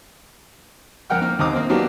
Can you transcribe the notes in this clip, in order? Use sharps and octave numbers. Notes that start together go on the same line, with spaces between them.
F2 A#4 F#5 G5 F6
A#3 F6
D#2 C4 D#4 A#5 D6 D#6
A#3 C4
F#3 A#3 B3 D4 F#4 G4